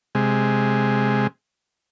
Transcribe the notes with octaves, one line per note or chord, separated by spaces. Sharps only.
C3 G#3